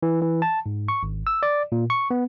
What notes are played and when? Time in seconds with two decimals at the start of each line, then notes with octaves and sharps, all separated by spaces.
0.03 E3
0.22 E3
0.42 A5
0.66 G#2
0.88 C#6
1.03 G#1
1.27 E6
1.43 D5
1.72 A#2
1.90 C#6
2.11 B3